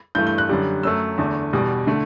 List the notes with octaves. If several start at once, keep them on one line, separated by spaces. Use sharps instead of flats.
G2 E3 A3 G6
G6
F#6
F#2 D3 G3
F#2 F#3 A3 E6
E2 D3 A3
E2 B2 G3
D3 A3